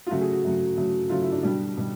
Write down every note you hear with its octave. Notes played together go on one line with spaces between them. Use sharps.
F4
C#3 F#3 A3 F#4
G#4
F#4
C#3 F#3 A3
C#3 F#3 A3
C#3 F#3 A3 F4
E4
D4
B2 G3 D4
B2 G3